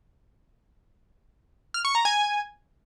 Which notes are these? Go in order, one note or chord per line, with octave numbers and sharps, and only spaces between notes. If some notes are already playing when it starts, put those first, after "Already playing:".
F6
C#6
A#5
G#5